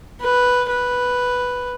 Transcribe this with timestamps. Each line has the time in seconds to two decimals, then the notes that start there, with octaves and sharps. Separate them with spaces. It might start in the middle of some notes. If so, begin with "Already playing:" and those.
0.21 B4
0.69 B4